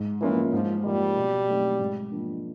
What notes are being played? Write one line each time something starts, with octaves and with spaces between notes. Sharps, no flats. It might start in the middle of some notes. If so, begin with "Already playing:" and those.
Already playing: G#2
E3 F3 A#3 C#4 F4
G#2 F3
F3 G3 A#3 D#4
B2
F#3 A3 C4 D#4
G#2
F3 A#3 D4